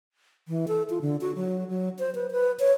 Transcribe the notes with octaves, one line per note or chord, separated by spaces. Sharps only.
E3
A4
F4
D3
F#4
F#3
F#3
C5
B4
B4
C#5